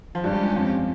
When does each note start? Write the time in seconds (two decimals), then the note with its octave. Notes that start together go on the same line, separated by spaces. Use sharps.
0.15 F3
0.24 G2 G3 G#3 C#4 G4
0.55 F2 F3